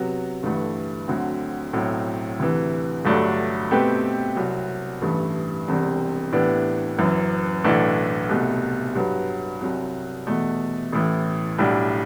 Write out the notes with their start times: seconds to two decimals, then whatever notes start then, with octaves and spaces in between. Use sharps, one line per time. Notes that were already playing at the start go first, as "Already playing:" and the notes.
Already playing: C3 F#3 B3 F#4
0.43 G1 G2 E3 A3
1.08 D2 D3 F#3 C4 F#4
1.73 B1 A2 F#3 C4 F#4
2.39 D2 C3 E3
3.05 G1 G2 F#3 A3 D4
3.71 B2 A3 C4 G4 B4
4.36 C2 C3 F#3
5.02 A1 G2 E3 A3
5.67 E1 E2 C3 G3 C4
6.32 A2 E3 B3 D4 G4
6.98 F#1 F#2 E3
7.64 B1 A2 E3 A3 D4
8.29 C2 B2 A3
8.95 G2 F#3 B3
9.61 C2 C3 F#3
10.27 E2 B2 A3
10.92 A1 A2 E3
11.58 B1 A2 G3 D4